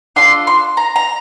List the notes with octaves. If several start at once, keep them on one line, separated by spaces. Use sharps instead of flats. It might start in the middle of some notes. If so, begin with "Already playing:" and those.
D4 F4 A4 C6
C6
A#5
A#5